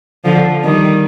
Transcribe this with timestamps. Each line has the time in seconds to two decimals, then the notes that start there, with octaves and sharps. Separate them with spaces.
0.24 D3 F3
0.63 D#3 G3